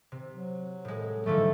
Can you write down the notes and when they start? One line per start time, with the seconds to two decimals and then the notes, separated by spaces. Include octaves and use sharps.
0.12 C3
0.31 F#3
0.85 A2 G#3
1.26 G#2 D3 F3 G3 A3